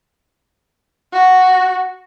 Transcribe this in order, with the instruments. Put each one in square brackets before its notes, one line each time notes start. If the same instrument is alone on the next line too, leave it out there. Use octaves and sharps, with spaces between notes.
[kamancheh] F#4